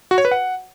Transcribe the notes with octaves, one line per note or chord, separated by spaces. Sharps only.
F#4
C#5
B4
F#5